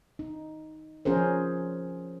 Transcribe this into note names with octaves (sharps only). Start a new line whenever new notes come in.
D#4
F3 C#4 G#4 A#4 C5